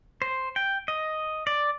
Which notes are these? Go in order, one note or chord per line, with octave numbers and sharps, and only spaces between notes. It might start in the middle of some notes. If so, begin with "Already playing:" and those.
C5
G5
D#5
D5